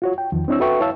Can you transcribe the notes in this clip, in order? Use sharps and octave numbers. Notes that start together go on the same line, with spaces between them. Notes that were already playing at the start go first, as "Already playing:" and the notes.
F4 F#4 C#5
G5
E2 D#3 F3
C4 D4 E4 C#5 E6
F#4 A4 B4 E5 G5 C#6
E4 C#5 F5 A5 E6